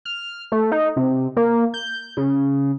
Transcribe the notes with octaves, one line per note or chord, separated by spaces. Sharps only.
F6
A3
D#4
C3
A#3
G6
C#3